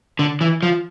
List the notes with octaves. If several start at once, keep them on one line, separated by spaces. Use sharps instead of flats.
D3
E3
F3